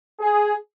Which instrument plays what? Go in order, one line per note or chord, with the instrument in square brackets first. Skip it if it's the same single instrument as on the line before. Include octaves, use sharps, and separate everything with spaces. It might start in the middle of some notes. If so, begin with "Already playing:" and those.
[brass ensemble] G#4